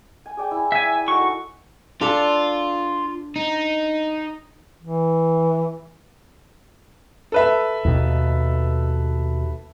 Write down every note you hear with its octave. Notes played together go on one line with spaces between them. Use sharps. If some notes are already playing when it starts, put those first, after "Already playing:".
G#5
G#4 D5 G5
E4
E5 G#5
A3 D#4 F#4 C#6
D4 F4 A4
D#4
E3
A4 B4 E5
D#2 B2